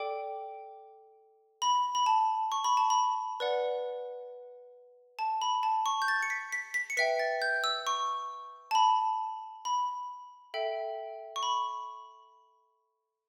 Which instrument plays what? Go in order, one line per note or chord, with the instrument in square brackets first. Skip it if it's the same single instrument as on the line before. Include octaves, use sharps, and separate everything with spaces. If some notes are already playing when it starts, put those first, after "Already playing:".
Already playing: [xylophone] A4 D5 G5 D6
B5
B5
A5
C#6
B5
A5
B5
B4 D5 F#5
A5
B5
A5
C#6
G6
A6
C#7
B6
B6
B6
C#7
B4 E5 G5 B6
A6
G6
E6
C#6
A5
B5
B5
A4 E5 G5
C#6
B5